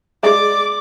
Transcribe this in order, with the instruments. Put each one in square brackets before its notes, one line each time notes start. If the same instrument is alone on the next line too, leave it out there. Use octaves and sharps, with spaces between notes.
[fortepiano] G#3 [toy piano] G#4 E5 [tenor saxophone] D5 [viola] D6